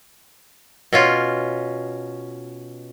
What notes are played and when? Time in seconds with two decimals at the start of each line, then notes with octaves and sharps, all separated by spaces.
0.93 B2 C#4 F4